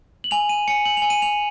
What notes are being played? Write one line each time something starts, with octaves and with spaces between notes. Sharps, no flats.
F#7
G#5 F7
D#7
G#5 C#7
F#7
G#5 F7
D#7
F7